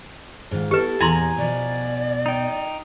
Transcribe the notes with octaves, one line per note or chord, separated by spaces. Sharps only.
G#2 D#3 F4
B3 E4 G4 A4 B4
E2 A#2 B3 E4 G#5 A#5 C6
B2 F3 D5
D#4 G5